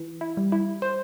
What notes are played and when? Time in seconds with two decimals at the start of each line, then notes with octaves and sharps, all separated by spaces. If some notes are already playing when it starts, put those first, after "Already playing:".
Already playing: E3
0.21 E4
0.37 G3
0.52 E4
0.82 C5